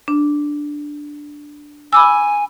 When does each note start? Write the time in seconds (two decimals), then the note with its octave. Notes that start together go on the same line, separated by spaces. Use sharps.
0.08 D4
1.93 G#5 B5 D6 E6